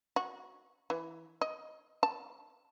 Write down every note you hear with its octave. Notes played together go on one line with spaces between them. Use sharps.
F#4
E3
D#5
A5